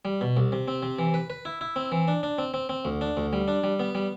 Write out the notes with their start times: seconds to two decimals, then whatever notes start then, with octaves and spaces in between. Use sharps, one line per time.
0.05 G3
0.21 B2
0.37 C2
0.52 C3
0.68 C4
0.83 C3
0.99 E3
1.14 B4
1.30 B4
1.45 E4
1.61 E4
1.76 C4
1.92 E3
2.08 D4
2.23 D4
2.38 C4
2.54 C4
2.69 C4
2.85 D2
3.01 D4
3.17 D2
3.33 G3
3.48 D4
3.64 G3
3.80 B3
3.95 G3